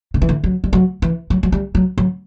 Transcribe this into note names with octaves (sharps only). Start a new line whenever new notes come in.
D3
E3
D3
F#3
G3
F#3
E3
F#3
F#3
G3
F#3
F#3